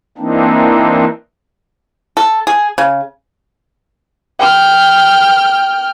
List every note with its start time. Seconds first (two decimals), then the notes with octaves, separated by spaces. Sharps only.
0.18 E3 A#3 C4 D4 D#4
2.17 A4
2.47 G#4
2.78 C#3
4.39 G5 F6